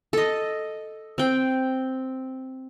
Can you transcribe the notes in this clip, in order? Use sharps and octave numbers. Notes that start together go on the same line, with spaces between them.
A4 D#5
C4 G5